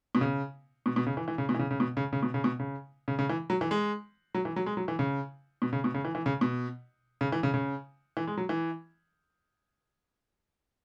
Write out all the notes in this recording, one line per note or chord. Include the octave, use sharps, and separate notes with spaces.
B2
C#3
B2
B2
C#3
E3
E3
C#3
B2
E3
C#3
C#3
B2
C#3
C#3
B2
C#3
B2
C#3
C#3
C#3
E3
F#3
E3
G#3
F#3
E3
F#3
G#3
F#3
E3
C#3
B2
C#3
B2
C#3
E3
E3
C#3
B2
C#3
E3
C#3
C#3
E3
G#3
F#3
E3